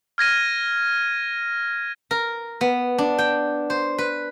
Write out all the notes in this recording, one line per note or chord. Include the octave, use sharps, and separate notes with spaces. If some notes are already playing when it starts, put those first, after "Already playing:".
F6 G#6 A#6 D#7
A#4
B3
D4
G5
C5
B4